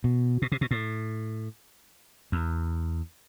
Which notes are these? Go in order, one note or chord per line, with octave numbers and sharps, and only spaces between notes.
B2
B2
C3
B2
A2
E2